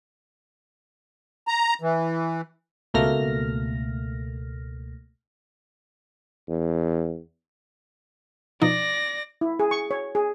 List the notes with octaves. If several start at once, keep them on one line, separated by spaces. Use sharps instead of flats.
A#5
E3
C#2 B2 A3 A#3 F6 A#6
E2
B2 F3 D#4 D5 A#6
E4
G#4
C#6
C#5
G#4